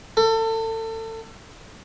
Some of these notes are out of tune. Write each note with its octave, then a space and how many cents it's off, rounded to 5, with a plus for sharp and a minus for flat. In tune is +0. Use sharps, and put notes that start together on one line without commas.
A4 +30